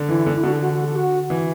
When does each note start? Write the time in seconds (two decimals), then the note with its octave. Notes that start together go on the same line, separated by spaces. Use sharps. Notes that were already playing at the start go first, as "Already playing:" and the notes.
Already playing: D3
0.09 E3 E4
0.26 D3
0.35 E4
0.43 D3 F#4
0.53 A4
0.61 F#4
0.73 F#4
0.84 A4
0.96 F#4
1.30 E3